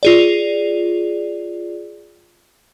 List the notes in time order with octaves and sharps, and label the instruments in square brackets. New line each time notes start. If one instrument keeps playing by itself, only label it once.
[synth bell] F4 G#4 D5